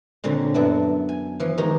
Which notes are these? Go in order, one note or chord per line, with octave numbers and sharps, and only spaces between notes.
A#2 D3 C4 C#4
F#2 B3 D4 E4
G#5
E3 F3
D#3 G#3 G4 A#4